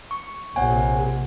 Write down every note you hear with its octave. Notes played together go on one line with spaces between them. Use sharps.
C#6
A#1 C3 C#5 F#5 G#5